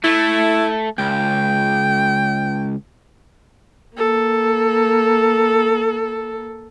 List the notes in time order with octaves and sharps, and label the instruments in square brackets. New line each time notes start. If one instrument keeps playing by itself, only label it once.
[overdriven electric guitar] A3 [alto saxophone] E4
[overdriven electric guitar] C#2 [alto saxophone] G5
[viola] A#3 A4